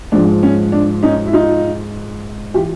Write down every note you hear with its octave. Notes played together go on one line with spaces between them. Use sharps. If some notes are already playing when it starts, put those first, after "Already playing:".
G#2 F3 D4
C#4
D4
C#4 D#4
E4
D#4 F4
E3 F4 G4